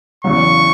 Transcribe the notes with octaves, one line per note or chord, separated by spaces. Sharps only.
E1 E2 C#3 F#3 C#6